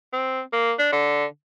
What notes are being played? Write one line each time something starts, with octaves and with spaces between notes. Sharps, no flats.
C4
A#3
D4
D3